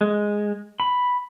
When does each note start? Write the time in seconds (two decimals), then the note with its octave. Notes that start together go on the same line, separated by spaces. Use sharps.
0.01 G#3
0.80 B5